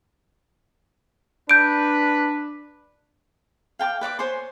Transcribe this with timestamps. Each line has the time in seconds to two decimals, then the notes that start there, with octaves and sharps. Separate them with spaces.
1.49 D4 B4 G6 D7
3.79 F5 G5 A5 D6
4.01 B4 D5 C#6 D6
4.19 C5 C#5 G#5 C6